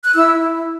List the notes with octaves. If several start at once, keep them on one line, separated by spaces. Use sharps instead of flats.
F#6
E4 E6
E4